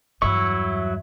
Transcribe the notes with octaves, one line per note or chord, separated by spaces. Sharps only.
E2 G2 F#3 E4 C#6